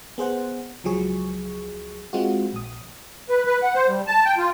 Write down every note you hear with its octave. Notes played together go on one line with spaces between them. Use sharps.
B3 G#4 C5 F#5
C#2 F3 F#3 G#4 C#6
G#3 C4 F4 F#4
A#1 D#6
B4
B4
F#5
C5
G3
A5
G5
F4